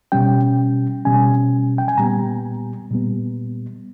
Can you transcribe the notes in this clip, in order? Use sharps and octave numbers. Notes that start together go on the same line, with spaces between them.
B2 G3 C#4 G5
B2 G3 C#4 G#5
G5
G#5
A#2 G3 B3 A#5
A#2 G3 B3